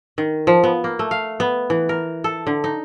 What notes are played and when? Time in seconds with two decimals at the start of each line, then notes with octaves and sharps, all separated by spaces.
0.18 D#3
0.47 F3
0.64 B3
0.84 A#3
0.99 A3
1.11 F5
1.40 B3
1.70 E3
1.89 A#4
2.24 A4
2.47 D3
2.64 D#4